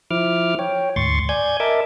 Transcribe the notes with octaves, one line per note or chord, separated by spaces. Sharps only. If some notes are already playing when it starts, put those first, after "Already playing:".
F3 E4 D6 F6
C#5 G5
D2 G#2 C6 C#6 A6
D5 G#5 G6 G#6
A#4 D#5 E5 A5 D6